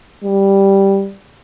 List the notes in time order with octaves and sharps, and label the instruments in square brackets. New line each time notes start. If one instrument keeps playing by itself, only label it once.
[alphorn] G3